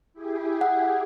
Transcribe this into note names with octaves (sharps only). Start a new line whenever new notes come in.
E4 G4 G#4
F#5